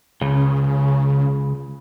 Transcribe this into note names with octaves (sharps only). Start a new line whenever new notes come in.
C#2 C#3